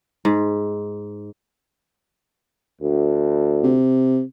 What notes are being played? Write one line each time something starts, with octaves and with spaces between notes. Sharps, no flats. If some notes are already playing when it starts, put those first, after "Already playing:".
G#2
D2
C3